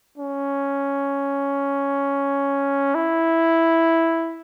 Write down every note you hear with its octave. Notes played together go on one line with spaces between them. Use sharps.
C#4
E4